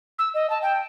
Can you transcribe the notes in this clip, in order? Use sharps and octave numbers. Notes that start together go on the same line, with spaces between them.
E6
D#5
A5
G5